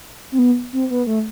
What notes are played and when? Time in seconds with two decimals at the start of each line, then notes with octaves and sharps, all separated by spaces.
0.32 C4
0.39 B3
0.73 C4
0.90 B3
1.07 A3